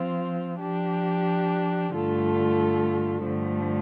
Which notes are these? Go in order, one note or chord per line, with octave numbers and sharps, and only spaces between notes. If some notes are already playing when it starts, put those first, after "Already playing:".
Already playing: F3 C4 F4
F3 D4 G4
G2 D3 A3 F4 A4
G2 D3 F3 A3